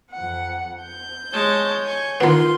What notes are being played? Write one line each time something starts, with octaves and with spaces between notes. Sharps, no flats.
F2 F#5
G6
G#3 C#5 A5
G#5 C#6
D#3 B3 F4 C6